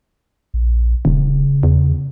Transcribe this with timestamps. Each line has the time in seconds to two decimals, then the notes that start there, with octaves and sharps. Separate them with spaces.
0.54 A#1
1.05 D#1 C#3
1.63 E2